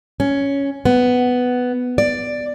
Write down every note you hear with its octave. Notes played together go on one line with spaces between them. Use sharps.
C#4
B3
D5